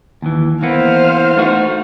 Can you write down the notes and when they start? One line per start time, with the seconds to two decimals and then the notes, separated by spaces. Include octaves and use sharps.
0.22 D#2 E3
0.63 E3 A#3 B3 C5 F5
1.36 A3 D#4 F#4